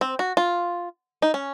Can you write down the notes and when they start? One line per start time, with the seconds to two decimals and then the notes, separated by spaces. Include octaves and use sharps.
0.01 C4
0.19 F#4
0.37 F4
1.22 D#4
1.34 C#4